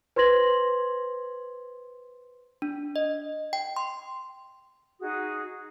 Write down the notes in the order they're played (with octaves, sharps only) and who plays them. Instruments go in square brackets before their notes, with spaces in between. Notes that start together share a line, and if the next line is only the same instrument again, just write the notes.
[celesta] B4 C5 C6 G#6 A#6 F#7
[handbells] D4
D#5
G5
C6
[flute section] D#4 F#4 G#4 D#6